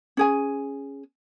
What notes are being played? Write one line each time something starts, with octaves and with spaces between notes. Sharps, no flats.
C#4 G#4 G#5